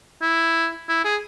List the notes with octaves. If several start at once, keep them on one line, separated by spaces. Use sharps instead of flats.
E4
E4
G#4